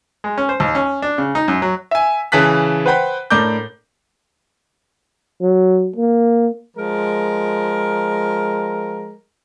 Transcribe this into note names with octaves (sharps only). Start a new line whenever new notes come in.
G#3
C#4
C5
D#2
C#4
D4
C#3
D#4
F#2
F#3
E5 G#5
C#3 E3 A5 F#6 B6
B4 C5 F#5 G5 B5
A2 D4 A#4 D6 G6
F#3
A#3
F3 G#3 A#4